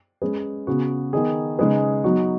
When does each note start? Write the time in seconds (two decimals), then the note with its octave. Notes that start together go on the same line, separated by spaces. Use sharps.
0.22 G#3 C#4 G#4 B4
0.67 C#3 B3 F#4
1.13 D#3 B3 D#4 G#4
1.59 C#3 G#3 D#4 G#4 B4
2.04 F#3 B3 D#4 F#4